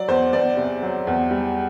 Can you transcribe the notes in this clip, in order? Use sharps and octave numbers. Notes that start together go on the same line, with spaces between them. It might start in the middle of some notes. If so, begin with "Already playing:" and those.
Already playing: F#3 D5
E2 C5
E2 D5
C3
F#3
E2
G3